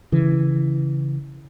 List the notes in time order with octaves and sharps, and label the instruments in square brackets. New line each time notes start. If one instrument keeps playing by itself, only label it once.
[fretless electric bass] C#3 E3